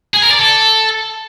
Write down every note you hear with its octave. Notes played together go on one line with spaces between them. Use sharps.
G#4
A#4
D5
A4